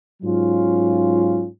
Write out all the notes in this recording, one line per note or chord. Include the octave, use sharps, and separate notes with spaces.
G#2 F#3 C#4 F4